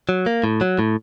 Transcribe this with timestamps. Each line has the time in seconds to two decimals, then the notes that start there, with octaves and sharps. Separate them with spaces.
0.09 F#3
0.26 A#3
0.44 A2
0.61 F#3
0.79 A2